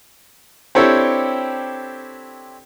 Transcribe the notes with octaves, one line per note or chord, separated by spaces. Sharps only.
C4 D4 E4 G4 A4 C#5